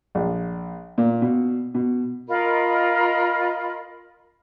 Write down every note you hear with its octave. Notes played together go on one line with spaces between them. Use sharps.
A#1
A#2
B2
B2
F4 A#4 D#5 B5